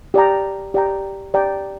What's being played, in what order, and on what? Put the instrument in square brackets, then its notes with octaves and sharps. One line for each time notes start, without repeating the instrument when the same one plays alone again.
[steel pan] G4 D5 G5 A#5
G4 D5 G5 A#5
G4 D5 G5 A#5